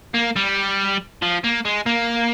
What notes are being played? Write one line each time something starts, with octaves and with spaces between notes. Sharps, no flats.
A#3
G3
F3
A#3
G#3
A#3